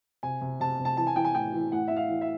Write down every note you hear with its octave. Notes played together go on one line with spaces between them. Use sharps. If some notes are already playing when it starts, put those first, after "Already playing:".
C3 G#5
C3
C3 A5
C3
A5
E3 A5
G#5
E3 G5
G#5
A2 G5
E3
A2 F#5
A2 E5
F5
E3
E5